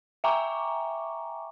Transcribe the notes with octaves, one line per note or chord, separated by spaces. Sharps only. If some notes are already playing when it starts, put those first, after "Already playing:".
E5 G5 G#5 A#5 C#6 D6